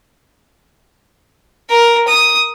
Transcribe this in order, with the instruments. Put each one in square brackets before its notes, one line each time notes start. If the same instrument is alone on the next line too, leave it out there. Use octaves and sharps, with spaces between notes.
[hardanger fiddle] A#4
D#6